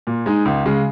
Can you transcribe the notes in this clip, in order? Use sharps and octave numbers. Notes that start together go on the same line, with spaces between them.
A#2
G#3 D#4
C#2
C#3 G#3